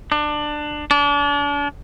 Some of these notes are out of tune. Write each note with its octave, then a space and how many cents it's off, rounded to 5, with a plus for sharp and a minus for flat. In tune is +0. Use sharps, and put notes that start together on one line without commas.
D4 +20
D4 -35